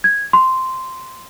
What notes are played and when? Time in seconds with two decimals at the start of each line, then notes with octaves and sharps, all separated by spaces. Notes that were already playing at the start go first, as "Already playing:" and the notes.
0.04 G#6
0.33 C6